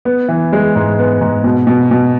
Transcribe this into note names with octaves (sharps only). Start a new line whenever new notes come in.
B3
E3
G#3
G#2
B3
G#2
B2
B2
B2